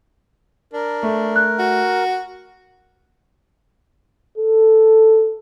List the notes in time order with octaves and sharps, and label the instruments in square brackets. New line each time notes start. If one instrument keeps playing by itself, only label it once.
[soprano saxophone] D4 [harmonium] A#4
[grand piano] A3
[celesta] F#6
[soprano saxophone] F#4
[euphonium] A4